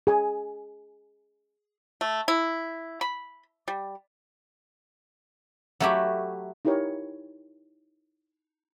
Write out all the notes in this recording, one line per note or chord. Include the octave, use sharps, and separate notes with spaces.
G#4 G#5
A3
E4
B5
G3
F#3 A3 E4 F#4 G4
D#4 E4 G4 A#4 C#5